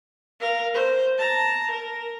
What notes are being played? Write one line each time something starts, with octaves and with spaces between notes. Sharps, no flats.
A#4 F5
C5
A5 A#5
A#4